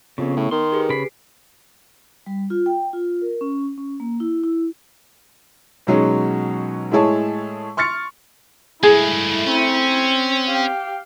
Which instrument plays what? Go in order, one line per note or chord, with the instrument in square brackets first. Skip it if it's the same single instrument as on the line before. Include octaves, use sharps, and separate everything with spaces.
[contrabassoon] F2 [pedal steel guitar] C#3 [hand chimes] B3 C#6
[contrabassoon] A2
[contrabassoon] D#3 [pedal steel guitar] C6
[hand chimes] G4 G#4 B4
[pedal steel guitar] C#3 B5 [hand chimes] B6 C7 D7
[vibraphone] G3
F4
G5
F4
A#4
C#4
C#4
A#3
E4
E4
[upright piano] B2 D#3 F#3 G#3 C#4
A2 G#3 E4 G#4 C#5 A5
C6 C#6 F6 A6 C#7
[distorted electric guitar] G2 G#3 [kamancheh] A3 E4 [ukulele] G#4
[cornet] C4 [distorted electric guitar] C#4
[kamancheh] G4 F5